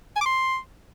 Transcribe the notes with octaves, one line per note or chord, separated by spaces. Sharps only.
G#5
D6
C6